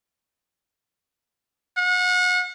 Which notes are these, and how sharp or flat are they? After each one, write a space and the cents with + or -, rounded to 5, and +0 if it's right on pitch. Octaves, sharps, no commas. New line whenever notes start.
F#5 -35